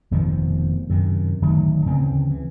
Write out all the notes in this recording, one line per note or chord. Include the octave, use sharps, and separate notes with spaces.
F1 B2 D#3 F3
F#2 C3 D#3
D1 D#3 F#3 A3
D2 C#3 E3 C4
E3